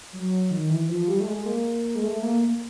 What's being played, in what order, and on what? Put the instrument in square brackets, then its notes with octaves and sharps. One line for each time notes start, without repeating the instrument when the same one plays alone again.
[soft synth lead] F#3
D#3
E3
E3
F3
G3
A3
G#3
A#3
G#3
A3
A#3